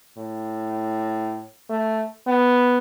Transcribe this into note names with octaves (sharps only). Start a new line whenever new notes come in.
A2
A3
B3